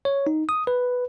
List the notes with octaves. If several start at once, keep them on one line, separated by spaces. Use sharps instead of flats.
C#5
D#4
D#6
B4